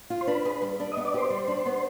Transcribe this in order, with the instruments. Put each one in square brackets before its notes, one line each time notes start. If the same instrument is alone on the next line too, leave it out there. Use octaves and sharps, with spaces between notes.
[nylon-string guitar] F4
[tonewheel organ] C5
[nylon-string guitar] D4 [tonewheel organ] B4
[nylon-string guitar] G#4
G3
D4
[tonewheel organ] D#5
[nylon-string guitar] B3
[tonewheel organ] D5
[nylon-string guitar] G4 [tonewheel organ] C5
[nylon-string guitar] G3
D4
B3